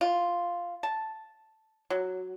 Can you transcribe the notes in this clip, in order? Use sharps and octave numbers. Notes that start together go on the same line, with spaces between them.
F4
A5
F#3